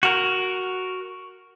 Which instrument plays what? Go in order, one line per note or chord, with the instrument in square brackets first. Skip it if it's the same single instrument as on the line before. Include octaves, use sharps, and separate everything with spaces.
[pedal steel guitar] F#4 A#4